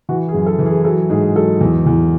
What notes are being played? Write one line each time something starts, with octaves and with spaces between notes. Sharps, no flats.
E3 F#4
G#4
F#2
A4
E3
G#4
F#3 A4
G#2 G#4
F#3 A4
E2
E2